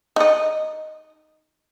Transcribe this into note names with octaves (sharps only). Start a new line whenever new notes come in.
D#4 D#5